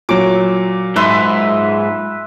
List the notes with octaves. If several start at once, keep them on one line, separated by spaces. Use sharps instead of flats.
A#2 F#3 D6
G#2 B4 E5 C6